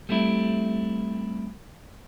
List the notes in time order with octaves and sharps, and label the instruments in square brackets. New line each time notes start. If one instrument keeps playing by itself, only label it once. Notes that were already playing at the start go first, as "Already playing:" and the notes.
[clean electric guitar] G3 A3 C4 E4